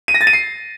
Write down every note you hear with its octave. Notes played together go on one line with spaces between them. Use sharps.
D#7
A#6
A6
D#7
C7